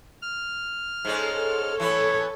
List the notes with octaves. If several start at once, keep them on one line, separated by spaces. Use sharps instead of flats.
F6
G#2 G#3 C#4 A4
E3 B3 C#4 C#5